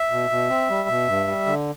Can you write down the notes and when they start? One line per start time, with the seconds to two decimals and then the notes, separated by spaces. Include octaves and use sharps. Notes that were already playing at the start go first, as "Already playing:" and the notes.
Already playing: E5
0.11 B2
0.30 B2
0.50 C4
0.69 G3
0.89 B2
1.08 G2
1.27 G3
1.46 D3